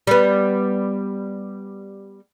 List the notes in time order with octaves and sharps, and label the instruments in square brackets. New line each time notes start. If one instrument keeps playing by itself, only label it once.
[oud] G3 B3